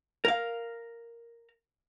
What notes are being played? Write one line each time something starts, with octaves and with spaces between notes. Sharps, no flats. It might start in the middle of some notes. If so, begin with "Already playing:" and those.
A#4 F5